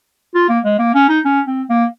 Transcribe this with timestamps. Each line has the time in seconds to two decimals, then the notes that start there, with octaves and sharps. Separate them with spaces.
0.35 F4
0.49 A#3
0.65 G#3
0.79 A#3
0.95 C#4
1.09 D#4
1.25 C#4
1.47 C4
1.69 A#3